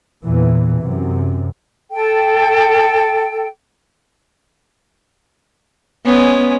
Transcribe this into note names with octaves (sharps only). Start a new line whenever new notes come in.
E2 A#2 E3
F#2 C3
A4 G5
G#3 B3 C#4